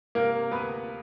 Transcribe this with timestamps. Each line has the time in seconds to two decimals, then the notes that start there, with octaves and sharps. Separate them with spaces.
0.15 C3 A#3 A#4
0.52 D2 B3 B4